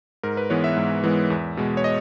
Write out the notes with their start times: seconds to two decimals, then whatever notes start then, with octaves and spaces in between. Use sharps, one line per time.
0.23 G#2 A#4
0.37 B4
0.50 E3 G#3 B3 C#5
0.64 E5
0.76 G#2
1.04 E3 G#3 B3
1.30 E2
1.57 B2 G#3
1.77 C#5
1.84 D#5